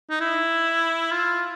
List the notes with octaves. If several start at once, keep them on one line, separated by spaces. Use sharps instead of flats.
D#4
E4
F4